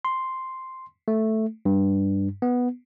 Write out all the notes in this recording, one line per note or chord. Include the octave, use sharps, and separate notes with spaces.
C6
A3
G2
B3